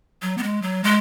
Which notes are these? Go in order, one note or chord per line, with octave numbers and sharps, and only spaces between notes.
F#3
B3
G#3
F#3
G#3